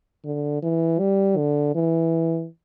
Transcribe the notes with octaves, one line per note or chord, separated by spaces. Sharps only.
D3
E3
G3
D3
E3